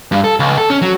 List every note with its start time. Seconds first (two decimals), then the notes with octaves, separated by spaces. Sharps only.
0.12 G2
0.24 A4
0.40 C#2
0.58 A4
0.70 C#4
0.82 F#3